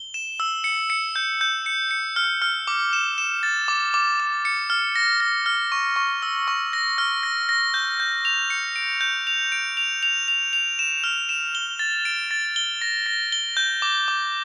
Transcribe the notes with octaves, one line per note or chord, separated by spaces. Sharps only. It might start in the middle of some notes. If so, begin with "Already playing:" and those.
Already playing: G7
E7
E6
C#7
C#7
G6
G6
C#7
C#7
F6
F6
D6
E7
E7
A6
D6
D6
D6
C#7
F6
A#6
A#6
F6
C#6
C#6
E6
C#6
A#6
F6
A#6
A#6
G6
G6
F7
C#7
D7
G6
F7
D7
F7
F7
F7
F7
E7
F6
E7
G7
A6
D7
A6
G7
A#6
A#6
G7
G6
D6
D6